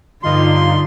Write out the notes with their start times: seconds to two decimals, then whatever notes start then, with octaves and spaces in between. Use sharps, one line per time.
0.23 G2 D3 D#4 F4 C6